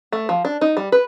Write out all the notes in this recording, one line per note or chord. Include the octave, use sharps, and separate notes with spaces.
A3
F3
D4
D#4
G3
B4